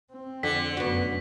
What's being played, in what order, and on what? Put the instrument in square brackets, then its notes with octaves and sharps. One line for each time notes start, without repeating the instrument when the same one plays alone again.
[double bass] C4
[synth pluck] F2 [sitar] D3 [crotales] B6
[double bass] F1 F#2 [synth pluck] B3 F#4